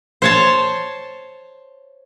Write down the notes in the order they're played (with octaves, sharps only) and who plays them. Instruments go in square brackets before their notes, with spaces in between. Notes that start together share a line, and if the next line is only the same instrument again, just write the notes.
[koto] C5 C#5 A5